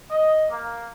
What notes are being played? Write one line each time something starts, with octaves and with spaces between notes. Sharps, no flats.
D#5
A#3